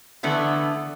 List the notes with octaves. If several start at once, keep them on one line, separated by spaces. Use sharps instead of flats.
D3 E3 A3 B3 D4